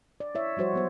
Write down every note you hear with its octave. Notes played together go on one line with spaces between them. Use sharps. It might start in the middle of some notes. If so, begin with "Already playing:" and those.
D5
E4 C#5 E5
F3 G3 F#4 C5 C#5
F#3 B3 C5